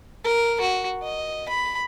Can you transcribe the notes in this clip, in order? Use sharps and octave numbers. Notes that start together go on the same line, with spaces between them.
A#4
F#4
D#5
B5